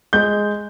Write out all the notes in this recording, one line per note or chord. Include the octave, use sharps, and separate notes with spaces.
G#3 G6